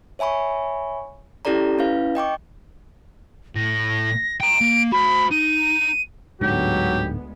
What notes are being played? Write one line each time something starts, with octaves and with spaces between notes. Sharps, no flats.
C#5 E5 G#5 B5 C#6
C#4 E4 G4 A4 D5 A#5
C#4 E4 B4 F5
D#5 G5 C#6 D6
A2 A#6
G5 A#5 D7
A#3
F#4 C5 B5
D#4 D#7
D1 D2 G#2 D3 F#3 G#3 B3 G4